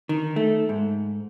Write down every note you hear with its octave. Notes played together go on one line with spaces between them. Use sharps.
D#3
A3
G#2